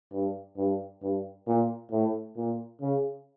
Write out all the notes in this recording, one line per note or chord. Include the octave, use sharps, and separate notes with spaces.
G2
G2
G2
A#2
A2
A#2
C#3